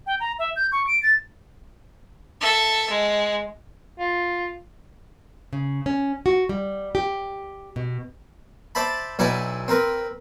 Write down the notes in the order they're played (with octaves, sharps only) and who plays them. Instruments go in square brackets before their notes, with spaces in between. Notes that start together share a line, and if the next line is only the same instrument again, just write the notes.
[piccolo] G5
A#5
E5
G6
C#6
D7
A6
[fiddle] A4 E5
G#3
[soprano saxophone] F4
[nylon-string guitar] C#3
C#4
F#4
G3
G4
B2
[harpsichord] C5 D5 E5 A5 B5
B1 B2 D#4 E4 D5 G#5
C4 A#4 B4